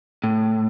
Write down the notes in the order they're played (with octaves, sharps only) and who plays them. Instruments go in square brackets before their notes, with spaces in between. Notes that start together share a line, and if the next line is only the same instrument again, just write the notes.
[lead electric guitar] A2